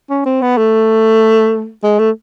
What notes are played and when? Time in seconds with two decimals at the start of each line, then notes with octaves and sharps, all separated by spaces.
0.10 C#4
0.26 C4
0.42 B3
0.58 A3
1.83 G#3
1.99 A3